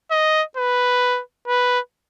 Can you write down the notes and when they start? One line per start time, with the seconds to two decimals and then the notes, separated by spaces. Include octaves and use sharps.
0.11 D#5
0.57 B4
1.48 B4